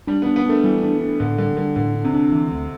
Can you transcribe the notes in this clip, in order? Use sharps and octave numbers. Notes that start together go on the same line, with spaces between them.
G3 D4
B3 D4
B3
A3 D4
E3 G3
D4
D4
A2 D3
D3 G3
D3 G3
A2 D3
D4
C3
D4
E3
D2